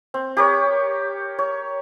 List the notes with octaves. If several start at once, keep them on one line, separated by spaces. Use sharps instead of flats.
C4
G4 A#4 C#5
C#5